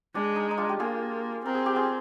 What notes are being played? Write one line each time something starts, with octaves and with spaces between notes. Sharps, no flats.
G#3 D4
D#4
D#4
D4 F4
G4
A#3 F4 G#4
C4 A#4
G#4
G4
F4 G#4